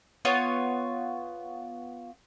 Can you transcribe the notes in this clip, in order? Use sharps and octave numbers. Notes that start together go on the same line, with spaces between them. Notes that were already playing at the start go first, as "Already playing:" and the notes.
B3 F4 C#5